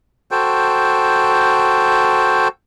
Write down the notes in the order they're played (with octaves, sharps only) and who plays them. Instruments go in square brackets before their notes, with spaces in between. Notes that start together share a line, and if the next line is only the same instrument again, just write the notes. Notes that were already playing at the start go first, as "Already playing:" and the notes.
[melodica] F#4 A4 C5 G5